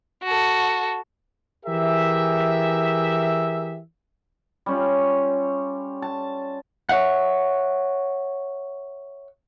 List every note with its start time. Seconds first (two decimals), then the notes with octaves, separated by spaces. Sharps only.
0.24 F#4 A4
1.66 E3 G4 G#4 A#4 E5
4.66 G3 C#4 F4
6.02 A5
6.89 C#5 D5 E5 F#5